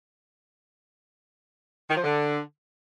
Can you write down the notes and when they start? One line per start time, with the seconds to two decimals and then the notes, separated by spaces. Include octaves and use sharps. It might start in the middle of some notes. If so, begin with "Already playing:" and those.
1.90 D#3
1.97 F3
2.04 D3